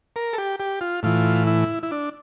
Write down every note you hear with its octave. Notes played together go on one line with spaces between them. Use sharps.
A#4
A4
G4
G4
F4
A2 E3 F4
E4
E4
D4